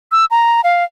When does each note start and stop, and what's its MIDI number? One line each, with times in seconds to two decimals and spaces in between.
0.12 0.25 88
0.31 0.61 82
0.64 0.84 77